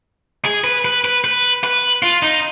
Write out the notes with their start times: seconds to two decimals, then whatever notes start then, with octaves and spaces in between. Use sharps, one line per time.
0.45 G#4
0.64 B4
0.85 B4
1.05 B4
1.24 B4
1.64 B4
2.03 F4
2.23 D#4